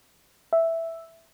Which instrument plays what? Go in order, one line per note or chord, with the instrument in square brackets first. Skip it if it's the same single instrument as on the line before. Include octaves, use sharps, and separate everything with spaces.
[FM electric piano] E5